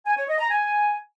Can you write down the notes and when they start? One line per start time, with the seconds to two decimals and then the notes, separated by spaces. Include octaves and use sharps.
0.06 G#5
0.17 C#5
0.28 D#5
0.39 A#5
0.50 G#5